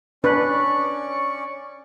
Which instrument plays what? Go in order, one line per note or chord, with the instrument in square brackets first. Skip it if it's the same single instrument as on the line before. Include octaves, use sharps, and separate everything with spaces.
[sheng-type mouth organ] C#4 D5 C#6 [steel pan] D4 B4